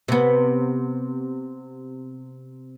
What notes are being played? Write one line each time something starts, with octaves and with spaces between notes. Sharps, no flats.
C3 B3